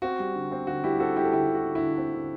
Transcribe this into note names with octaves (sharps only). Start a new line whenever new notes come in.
C4 F#4
G3
D3
C4
D3 F#4
G3 E4 G4
C4 F#4 A4
G3 E4 G4
A4
D3 E4 G4
D3
F#4
D3
E4
D3
C4
D3